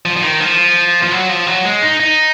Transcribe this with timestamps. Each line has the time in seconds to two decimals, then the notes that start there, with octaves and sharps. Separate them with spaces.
0.05 F3
0.17 F3
0.23 D#3
0.40 F3
1.03 F3
1.12 F#3
1.29 F3
1.47 F#3
1.65 G#3
1.82 D#4
2.00 D#4